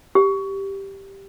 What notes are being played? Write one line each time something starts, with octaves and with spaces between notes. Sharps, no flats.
G4